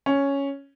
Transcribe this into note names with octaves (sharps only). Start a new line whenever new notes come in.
C#4